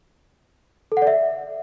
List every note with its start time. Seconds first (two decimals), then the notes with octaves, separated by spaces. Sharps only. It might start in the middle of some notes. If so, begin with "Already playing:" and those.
0.92 A4
0.97 F#5
1.02 D5
1.07 E5